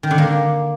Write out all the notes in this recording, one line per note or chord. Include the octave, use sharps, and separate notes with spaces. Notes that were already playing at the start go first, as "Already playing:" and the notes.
D#3
D3
A#3